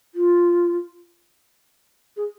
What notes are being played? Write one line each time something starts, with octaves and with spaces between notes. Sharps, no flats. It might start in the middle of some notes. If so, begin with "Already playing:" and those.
F4
G#4